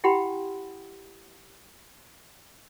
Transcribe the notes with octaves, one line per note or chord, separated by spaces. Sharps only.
E4 G4 F#5 G5 B5 C6